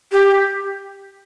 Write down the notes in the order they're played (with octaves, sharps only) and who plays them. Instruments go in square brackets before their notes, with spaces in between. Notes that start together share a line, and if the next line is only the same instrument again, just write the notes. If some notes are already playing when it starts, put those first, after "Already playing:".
[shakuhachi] G4